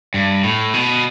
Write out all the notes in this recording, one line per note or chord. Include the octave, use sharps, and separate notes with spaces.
G2
A2
B2